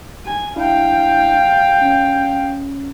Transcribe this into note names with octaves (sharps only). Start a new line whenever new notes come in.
G#5
D4 E4 F5 G5
C#4